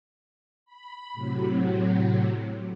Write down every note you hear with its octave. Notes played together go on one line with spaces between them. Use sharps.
B5
A2 C3 F#3